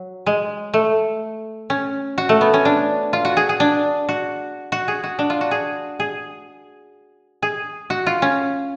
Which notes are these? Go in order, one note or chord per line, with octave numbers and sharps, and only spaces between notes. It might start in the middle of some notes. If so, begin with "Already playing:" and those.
Already playing: F#3
G#3
A3
C#4
F#4
A3
B3
C#4
D4
F4
F#4
G#4
G#4
D4
F#4
F#4
G#4
F#4
D4
F4
F#4
G#4
G#4
G#4
F#4
F4
C#4